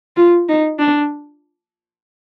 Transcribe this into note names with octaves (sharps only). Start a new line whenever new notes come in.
F4
D#4
D4